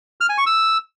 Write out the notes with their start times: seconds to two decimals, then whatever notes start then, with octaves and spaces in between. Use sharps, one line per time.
0.21 F6
0.29 G#5
0.38 C#6
0.46 E6